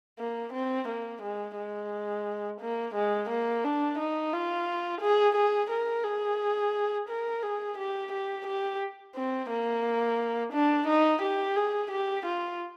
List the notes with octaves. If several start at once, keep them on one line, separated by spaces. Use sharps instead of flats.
A#3
C4
A#3
G#3
G#3
A#3
G#3
A#3
D4
D#4
F4
G#4
G#4
A#4
G#4
A#4
G#4
G4
G4
G4
C4
A#3
D4
D#4
G4
G#4
G4
F4